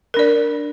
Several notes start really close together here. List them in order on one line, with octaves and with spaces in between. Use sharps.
A#4 D4 D5